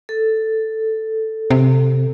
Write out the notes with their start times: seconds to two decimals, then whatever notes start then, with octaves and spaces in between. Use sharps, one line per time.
0.09 A4
1.51 C3